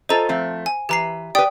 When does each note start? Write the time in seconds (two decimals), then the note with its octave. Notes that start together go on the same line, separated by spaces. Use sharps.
0.09 F4 A4 C5 D#5 A#5
0.29 F3 A3 C4
0.66 G#5
0.89 E3 G4 B4 A#5 C7
1.35 G4 B4 D5 G5 D#6